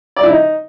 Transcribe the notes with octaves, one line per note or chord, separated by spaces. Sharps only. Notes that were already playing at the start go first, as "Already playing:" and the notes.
D5
E4
D#4